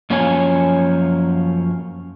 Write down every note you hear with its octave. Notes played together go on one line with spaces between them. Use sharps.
F#2 F3 A#3 C#4 C#5 G#5